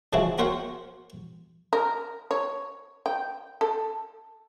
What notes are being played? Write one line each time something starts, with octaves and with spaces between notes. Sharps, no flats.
C#3 F3 G#3 E4 F#4
F#4 A#4 C5 C#5 F#5 G5
A#4
C#5
G5
A4